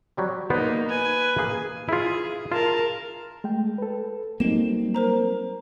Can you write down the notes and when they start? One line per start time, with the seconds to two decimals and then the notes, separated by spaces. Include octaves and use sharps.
0.17 F#3 G3 C4
0.50 A#3 B3 D#4 C5 D5
0.88 B4 G#5
1.38 A#3 G#4
1.89 E4 F4 G#4
2.52 F4 A#4 A5
3.44 G#3 A3 G5
3.78 A4 B4
4.40 F#3 G3 A#3 C4 D#4 E7
4.95 A#4 C5 A#5